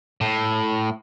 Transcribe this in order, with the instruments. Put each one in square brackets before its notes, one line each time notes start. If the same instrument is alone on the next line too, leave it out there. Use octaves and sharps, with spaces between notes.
[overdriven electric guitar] A2